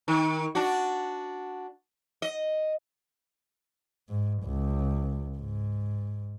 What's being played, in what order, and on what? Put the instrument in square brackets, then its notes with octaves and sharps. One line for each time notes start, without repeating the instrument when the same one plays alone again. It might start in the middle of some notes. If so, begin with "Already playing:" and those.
[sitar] D#3
D4 F#4
D#5
[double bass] G#2
C#2
G#2